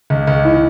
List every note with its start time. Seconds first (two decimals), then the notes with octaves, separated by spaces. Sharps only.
0.10 C#2
0.27 C#2
0.45 E3